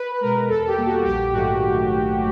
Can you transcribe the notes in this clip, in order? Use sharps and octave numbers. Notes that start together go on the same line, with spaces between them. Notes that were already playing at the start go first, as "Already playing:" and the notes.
Already playing: B4
B4
B2 G#3 A#4
E2 A4
G4
B2 G3 A#3
F#4
A#1 G4
G#2 D#3 F#3 A3 F#4